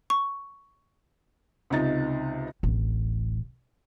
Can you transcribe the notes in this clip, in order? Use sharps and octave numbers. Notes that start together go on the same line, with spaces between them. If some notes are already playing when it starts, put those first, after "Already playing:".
C#6
C#2 C3 D#4 A6
D1 A1